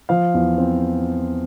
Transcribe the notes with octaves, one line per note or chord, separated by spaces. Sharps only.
F3 F5
E2
C4